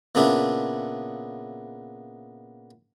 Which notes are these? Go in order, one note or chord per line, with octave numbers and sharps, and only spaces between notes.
A#2 C#3 B3 D4 E4